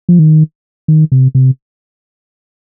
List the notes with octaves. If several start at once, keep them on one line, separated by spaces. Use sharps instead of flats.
F3
D#3
D#3
C3
C3